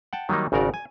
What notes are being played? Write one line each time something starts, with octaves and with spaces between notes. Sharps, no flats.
F#5 G5 A5
D#3 F#3 G3 A#3 D#4
G#1 C#3 F#4 A#4 D5
G#5